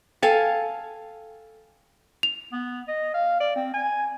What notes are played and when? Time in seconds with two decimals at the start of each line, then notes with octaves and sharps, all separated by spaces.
0.23 A4 F5 G5 G#5
2.23 F7
2.53 B3
2.88 D#5
3.14 F5
3.40 D5
3.56 C4
3.74 G#5